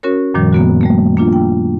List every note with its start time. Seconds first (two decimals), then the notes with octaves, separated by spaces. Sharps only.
0.03 C#4 F#4 A#4 C#5
0.34 F#2 A#2 D#3 F3 G3
0.53 A#3 B3 F#4
0.81 G3 A3 A#3
1.17 A#3 D4 F4
1.33 G5